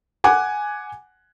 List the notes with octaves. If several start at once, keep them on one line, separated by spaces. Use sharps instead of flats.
F#5 G#5 D6